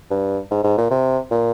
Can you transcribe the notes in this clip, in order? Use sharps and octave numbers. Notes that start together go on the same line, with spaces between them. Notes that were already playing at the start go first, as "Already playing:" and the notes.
G2
G#2
G#2
A#2
C3
A#2